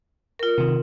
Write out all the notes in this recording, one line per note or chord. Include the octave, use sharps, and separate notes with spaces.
F4 A#4
C3 D#3